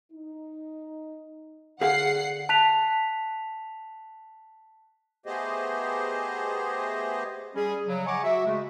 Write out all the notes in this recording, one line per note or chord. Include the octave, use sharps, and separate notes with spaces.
D#4
D3 G#4 F5 F#5 C7
A5 F#6 B6 F7
A3 B3 G4 G#4 C5 D#5
G3 C#4 G#4
C#3 F#3
D#5 F#5 G#5 A#5 C#6 D6
F#4 E5
C#3 G#3 A3